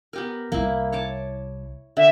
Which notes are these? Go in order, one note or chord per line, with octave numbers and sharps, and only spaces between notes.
B3 G4 A#4
C2 A#3 E4
C#5 A5 D6
D3 E5